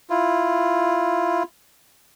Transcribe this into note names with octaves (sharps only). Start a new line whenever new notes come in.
E4 F4